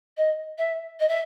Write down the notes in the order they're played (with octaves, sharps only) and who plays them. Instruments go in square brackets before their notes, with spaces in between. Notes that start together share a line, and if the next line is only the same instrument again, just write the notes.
[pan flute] D#5
E5
D#5
E5